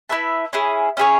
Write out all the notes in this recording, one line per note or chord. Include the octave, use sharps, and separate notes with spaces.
E4 B4 E5 A5
C#4 E4 G#4
C#4 E4 G#4 C#5